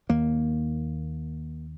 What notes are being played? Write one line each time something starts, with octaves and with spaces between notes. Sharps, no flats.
D#2 A#3